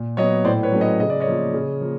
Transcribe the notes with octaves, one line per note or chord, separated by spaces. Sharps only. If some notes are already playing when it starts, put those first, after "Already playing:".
Already playing: A#2
F#3 B3 C#5 D#5
A2 C5 D5
B4 C#5
F#3 A3 C#4
C#5 D#5
C#3 D#5
D5
C#5 D#5
F3 A#3
C#3
F3 A#3